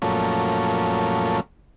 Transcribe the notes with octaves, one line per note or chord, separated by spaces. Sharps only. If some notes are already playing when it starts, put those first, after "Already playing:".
F#2 A#2 F3 A3 C#4